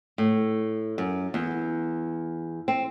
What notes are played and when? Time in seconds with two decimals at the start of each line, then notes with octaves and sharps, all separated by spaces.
0.18 A2
0.98 F#2
1.34 E2
2.68 C4